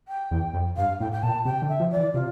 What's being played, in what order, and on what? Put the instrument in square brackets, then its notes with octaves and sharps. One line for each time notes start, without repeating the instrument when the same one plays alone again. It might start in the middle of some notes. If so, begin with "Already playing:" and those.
[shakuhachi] G5
[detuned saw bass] E2
F2
[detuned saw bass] G2 [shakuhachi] F5
[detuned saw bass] A2 [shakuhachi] G5
[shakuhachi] G5
[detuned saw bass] A#2 [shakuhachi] A5
[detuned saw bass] C3 [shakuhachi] G5
[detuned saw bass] D3
[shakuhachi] E5
[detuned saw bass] F3
[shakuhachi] D5
[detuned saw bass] E3
[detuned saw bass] C3 [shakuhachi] F4